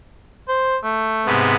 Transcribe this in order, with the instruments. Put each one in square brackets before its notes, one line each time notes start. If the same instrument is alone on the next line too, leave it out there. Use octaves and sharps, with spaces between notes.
[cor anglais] C5
A3
[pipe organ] G#2 C3 B3